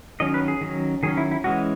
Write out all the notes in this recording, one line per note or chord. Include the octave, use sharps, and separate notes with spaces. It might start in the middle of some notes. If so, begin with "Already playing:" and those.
D#3 F#3 C#4 D#5
B4
G#4
D#3 F#3 C#4
D#3 F#3 C#4 G#4
E4
E4
E3 G#3 C#4 F#4